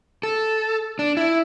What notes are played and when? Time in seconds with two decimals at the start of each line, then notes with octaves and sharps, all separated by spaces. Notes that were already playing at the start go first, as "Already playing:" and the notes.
0.23 A4
0.99 D4
1.17 E4